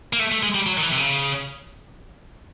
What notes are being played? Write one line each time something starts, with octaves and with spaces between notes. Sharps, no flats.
A#3
A3
A3
G#3
G3
F#3
D#3
E3
C3
C#3